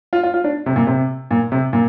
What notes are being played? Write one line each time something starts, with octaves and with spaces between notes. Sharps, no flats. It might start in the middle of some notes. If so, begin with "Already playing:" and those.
F4
F4
F4
D4
C3
A#2
C3
A#2
C3
A#2